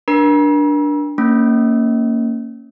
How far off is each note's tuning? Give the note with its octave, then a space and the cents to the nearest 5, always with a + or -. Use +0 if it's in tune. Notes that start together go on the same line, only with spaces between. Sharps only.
D4 +0 A#4 +35 A#5 +45
A#3 -20 C#4 +0